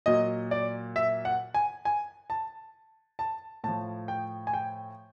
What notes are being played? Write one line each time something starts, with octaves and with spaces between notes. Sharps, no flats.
A#2 F#3 D#5
D5
E5
F#5
G#5
G#5
A5
A5
A2 F3 A5
G5
G#5
G5